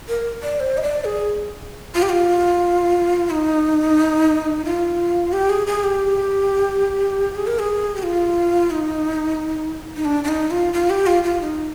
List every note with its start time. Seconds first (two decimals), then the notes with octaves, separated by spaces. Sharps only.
0.09 A#4
0.43 D5
0.60 C5
0.77 D#5
0.83 D5
1.05 G#4
1.95 F4
2.02 G4
2.10 F4
3.30 D#4
4.65 F4
5.33 G4
5.50 G#4
5.67 G#4
5.84 G4
7.35 G#4
7.47 A#4
7.59 G#4
7.96 G4
8.03 F4
8.71 D#4
9.96 D#4
10.05 D4
10.24 D4
10.28 D#4
10.51 F4
10.73 F4
10.90 G4
11.07 F4
11.24 F4
11.41 D#4